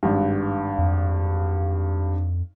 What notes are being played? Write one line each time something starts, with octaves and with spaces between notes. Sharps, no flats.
G#1 G2
F2